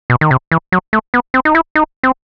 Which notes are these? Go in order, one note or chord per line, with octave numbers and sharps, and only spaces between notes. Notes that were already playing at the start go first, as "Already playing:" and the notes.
B2
D#3
C3
E3
F#3
A3
B3
C4
D#4
E4
D#4
C4